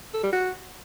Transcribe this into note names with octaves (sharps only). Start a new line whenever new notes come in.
A4
G3
F#4